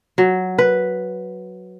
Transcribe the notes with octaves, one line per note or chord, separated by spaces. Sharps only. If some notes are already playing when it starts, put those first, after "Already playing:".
F#3
B4